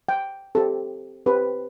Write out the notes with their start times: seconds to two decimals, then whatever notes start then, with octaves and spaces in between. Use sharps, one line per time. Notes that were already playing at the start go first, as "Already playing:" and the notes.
0.09 G5
0.55 C4 G4 A4
1.26 C4 G4 B4